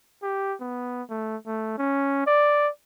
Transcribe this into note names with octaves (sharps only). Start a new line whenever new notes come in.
G4
B3
A3
A3
C#4
D5